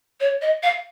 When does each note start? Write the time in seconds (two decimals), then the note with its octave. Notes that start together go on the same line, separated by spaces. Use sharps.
0.20 C#5
0.42 D#5
0.63 F5